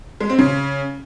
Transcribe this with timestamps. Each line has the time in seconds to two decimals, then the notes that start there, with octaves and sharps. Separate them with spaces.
0.21 G#3
0.30 C4
0.39 C#3